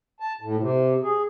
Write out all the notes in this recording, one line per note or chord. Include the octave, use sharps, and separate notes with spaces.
A5
A2
C3
G#4